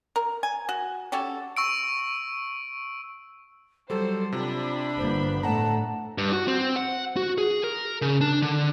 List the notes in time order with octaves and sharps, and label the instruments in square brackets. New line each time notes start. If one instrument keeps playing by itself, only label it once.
[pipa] A#4
G#5
F#4
C#4 F#4 G4 A4
[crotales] C#6 E6 D7
[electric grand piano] F#3 G3 [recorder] A4 [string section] C5
[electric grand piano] C3 [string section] D4 B5 [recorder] F4
[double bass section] G1 A#3 B3 [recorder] C5
[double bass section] A2 A3 [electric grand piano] F#5 A#5 [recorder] A5
[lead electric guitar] G2
F#4
C4
F#5
F#4
G#4
A#4
C#3
D4
D3